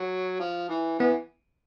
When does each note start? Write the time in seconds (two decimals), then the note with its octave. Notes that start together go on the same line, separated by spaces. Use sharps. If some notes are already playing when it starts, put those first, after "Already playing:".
Already playing: F#3
0.40 F3
0.69 E3
0.99 E3 B3